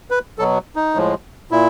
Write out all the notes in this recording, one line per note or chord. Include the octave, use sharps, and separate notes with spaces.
B4
B2 F#3 A4
D#4
A2 F3 G#3
A#2 E4